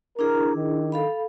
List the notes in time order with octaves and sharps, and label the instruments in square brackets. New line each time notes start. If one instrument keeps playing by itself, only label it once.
[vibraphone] D4 E4 G#4 [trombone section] A#4
[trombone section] D#3
[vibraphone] A4 F5 B5